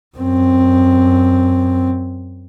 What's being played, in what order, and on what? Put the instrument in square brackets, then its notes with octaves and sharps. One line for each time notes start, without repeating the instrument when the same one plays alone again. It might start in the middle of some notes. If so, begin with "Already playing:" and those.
[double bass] F#2 C4